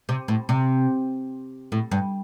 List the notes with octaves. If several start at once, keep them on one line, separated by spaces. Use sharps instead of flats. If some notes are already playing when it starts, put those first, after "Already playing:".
C3
A2
C3
A2
G2